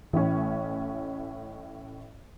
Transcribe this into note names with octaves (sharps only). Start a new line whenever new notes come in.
A1 A2 E3 C#4